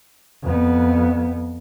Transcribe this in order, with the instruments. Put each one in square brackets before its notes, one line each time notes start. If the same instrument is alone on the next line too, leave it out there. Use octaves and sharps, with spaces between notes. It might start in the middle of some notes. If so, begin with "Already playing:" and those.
[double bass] F2 B3